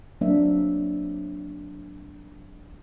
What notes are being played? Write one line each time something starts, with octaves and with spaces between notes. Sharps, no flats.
F#3 A#3 C4 D4 E5